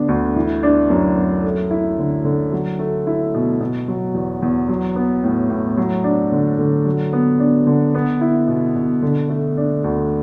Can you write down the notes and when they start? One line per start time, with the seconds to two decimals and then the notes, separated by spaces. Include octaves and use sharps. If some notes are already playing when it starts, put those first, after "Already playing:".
Already playing: D3 B3 D4
0.08 D2
0.36 E3
0.63 D4
0.90 F#2
1.17 F#2
1.44 A3
1.71 E4
1.98 D3
2.25 D3
2.52 F#3
2.79 A3
3.07 E4
3.34 B2
3.60 B2
3.88 F#3
4.15 E2
4.43 E2
4.69 F#3
4.96 B3
5.24 A2
5.50 A2
5.77 F#3
6.04 D4
6.32 D3
6.59 D3
6.85 F#3
7.13 B3
7.39 D4
7.67 D3
7.95 B3
8.21 E4
8.48 B2
8.76 B2
9.03 D3
9.29 A3
9.57 D4
9.84 D2